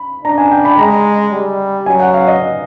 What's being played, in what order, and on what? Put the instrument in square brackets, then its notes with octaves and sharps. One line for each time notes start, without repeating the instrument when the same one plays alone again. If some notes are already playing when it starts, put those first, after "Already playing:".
Already playing: [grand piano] B5
[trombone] D4 [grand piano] A#5
[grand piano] G#5
G5
B5
[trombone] G#3 [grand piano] A#5
[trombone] G3
[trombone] F#3 [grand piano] G#5
[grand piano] F#5
F5
D#5